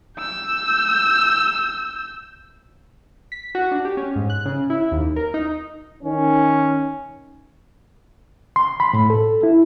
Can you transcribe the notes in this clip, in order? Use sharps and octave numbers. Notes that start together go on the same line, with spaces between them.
E6 G6
B6
F#4
D4
G4
C#4
G#2
F#6
C#3
E4
D#2
A#4
D#4
D#3 C#4
C6
B5
A2
A4
E4